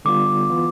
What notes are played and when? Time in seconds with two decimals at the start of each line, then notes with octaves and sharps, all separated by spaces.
0.05 D3 G3 B3 F4 D6
0.50 E3 B3 F4